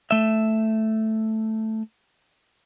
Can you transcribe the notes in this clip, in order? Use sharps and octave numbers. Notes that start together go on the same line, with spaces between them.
A3 E5